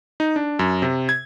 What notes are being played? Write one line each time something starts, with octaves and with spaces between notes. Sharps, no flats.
D#4
D4
F#2
C3
G#6